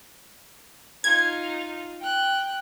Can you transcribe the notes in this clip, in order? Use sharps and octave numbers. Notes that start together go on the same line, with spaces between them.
D#4 F4 G#6
G5 F#6